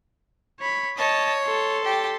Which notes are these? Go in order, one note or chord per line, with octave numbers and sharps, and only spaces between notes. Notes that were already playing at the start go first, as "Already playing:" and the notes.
C#5 B5
C#5 D#5 A5
A4 C6
G4